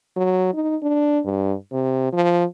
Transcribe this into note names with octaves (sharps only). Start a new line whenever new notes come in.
F#3
D#4
D4
G2
C3
F3